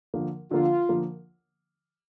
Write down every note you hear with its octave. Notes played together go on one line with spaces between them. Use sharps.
D3 F3 A#3
D3 F3 A#3 F4
D3 F3 A#3